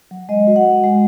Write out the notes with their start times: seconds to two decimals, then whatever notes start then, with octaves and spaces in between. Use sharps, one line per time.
0.11 F#3
0.29 G#3 D#5
0.47 F#4
0.56 F#5
0.65 F#4
0.84 G#3